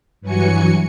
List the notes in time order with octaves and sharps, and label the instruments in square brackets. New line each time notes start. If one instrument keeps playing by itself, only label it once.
[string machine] G2 E3 F#3 F#4 G#5 C#7